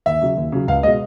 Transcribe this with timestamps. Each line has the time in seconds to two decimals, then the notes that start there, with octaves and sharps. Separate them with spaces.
0.06 D#2 E5
0.22 C#3 F#3
0.37 D#2
0.52 C#3 F#3
0.68 C#2 F5
0.83 B2 G#3 D#5